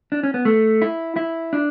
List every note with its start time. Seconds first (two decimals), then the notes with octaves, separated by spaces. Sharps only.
0.12 D4
0.23 C#4
0.34 B3
0.45 A3
0.82 E4
1.16 E4
1.53 D4